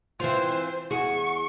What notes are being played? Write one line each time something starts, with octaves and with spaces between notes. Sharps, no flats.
E3 C4 F4 C5
E2 F#4 G#4 C#6